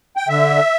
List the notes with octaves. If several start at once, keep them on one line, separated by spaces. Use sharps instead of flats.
G5
D3 E5